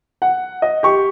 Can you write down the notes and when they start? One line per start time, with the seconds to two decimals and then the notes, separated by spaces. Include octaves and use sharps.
0.22 F#5
0.62 D#5
0.83 G4 C#6